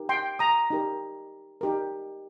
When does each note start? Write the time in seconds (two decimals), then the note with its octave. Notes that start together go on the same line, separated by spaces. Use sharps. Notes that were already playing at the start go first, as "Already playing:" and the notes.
Already playing: D#4 G4 A#4
0.09 G5 C6
0.39 A#5 D#6
0.70 D#4 G4 A#4
1.61 D#4 G4 A#4